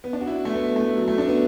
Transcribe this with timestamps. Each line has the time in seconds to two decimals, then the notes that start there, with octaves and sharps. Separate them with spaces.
0.04 B3
0.13 D4
0.21 F#4
0.27 E4
0.45 A3
0.55 B3
0.76 A3
0.97 F#3
1.08 A3
1.18 D4
1.28 B3